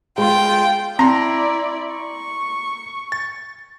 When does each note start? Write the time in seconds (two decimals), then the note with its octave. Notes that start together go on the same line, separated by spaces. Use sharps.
0.18 G#3 F4 G5
0.99 C4 E4 D5 A#5 C6
1.93 C#6
3.12 A6